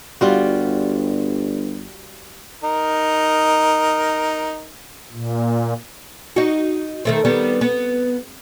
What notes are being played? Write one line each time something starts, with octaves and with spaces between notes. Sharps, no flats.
G1 G3 F4 F#4
D#4 A#4
A#2
D#4 F#4
D#3 A3 C4
D#3 G3 B3
B3